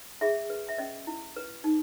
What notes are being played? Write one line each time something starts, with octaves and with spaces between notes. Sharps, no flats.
G#4 E5
B4
E5
C#4 D#5
E4
B4
D#4